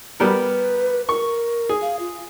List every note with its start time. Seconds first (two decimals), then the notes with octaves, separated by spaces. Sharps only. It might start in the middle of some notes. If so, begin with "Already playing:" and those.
0.20 G3 B3 A#4 B4
1.09 A#4 C#6
1.69 G#4
1.82 F5
2.00 F4